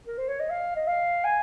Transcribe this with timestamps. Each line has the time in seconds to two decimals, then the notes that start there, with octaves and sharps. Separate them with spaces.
0.07 A#4
0.18 C5
0.29 C#5
0.40 D#5
0.50 F5
0.76 D#5
0.87 F5
1.25 G#5